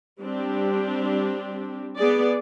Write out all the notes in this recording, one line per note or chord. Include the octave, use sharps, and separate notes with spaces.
G3 C4 D4 G4
B3 G#4 D5